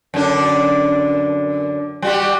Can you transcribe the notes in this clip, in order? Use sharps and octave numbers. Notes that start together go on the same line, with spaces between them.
F#2 D3 D4
G3 F#4 G4